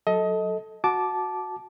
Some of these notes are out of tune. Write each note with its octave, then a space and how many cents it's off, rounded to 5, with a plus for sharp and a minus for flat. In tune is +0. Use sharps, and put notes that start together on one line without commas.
F#3 -5 A4 -5 D#5 +25
F#4 -10 A5 -15 D6 +0